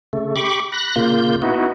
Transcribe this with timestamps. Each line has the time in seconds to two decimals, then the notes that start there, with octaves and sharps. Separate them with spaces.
0.13 C#3 A3
0.36 G4 B5 C#6 D6
0.72 B5 F#6 A#6
0.96 A#2 C#3 A#3 F4 G6
1.42 B3 D#4 E4 F#4